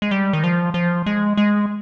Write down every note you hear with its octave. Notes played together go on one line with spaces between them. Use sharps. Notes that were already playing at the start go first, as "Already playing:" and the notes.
G#3
G3
D#3
F3
F3
G#3
G#3